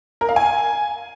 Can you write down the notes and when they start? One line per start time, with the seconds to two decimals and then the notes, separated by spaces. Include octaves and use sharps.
0.21 A#4
0.29 F5
0.36 G#5